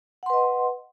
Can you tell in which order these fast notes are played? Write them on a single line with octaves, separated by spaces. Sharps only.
F#5 C6 B4 D#5